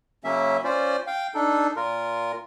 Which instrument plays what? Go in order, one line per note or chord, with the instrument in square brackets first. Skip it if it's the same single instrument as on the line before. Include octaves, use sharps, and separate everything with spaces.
[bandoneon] C#3 F#3 A#3 C#4 E5
C#4 F4 C5 D5
F5 G5
D4 D#4 A4
A#2 F4 A#4